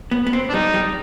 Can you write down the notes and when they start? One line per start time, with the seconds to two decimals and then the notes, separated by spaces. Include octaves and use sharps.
0.11 B3
0.27 B3
0.33 C4
0.49 D4
0.54 G3 D#4
0.74 G3